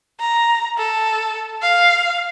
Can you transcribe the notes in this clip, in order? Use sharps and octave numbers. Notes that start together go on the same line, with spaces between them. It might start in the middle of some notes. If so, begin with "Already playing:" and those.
A#5
A4
F5